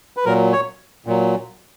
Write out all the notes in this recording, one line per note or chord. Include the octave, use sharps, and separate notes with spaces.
B4
A#2 F#3 A#4
C#5
A#2 F#3